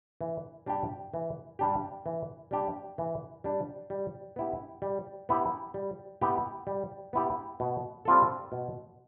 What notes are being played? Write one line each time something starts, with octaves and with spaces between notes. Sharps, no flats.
E3
G3 D4 G4
E3
G3 D4 G4
E3
G3 D4 G4
E3
G3 D4 G4
G3
B3 E4 G4
G3
B3 E4 G4
G3
B3 E4 G4
G3
B3 E4 G4
B2
G3 C4 F4 A4
B2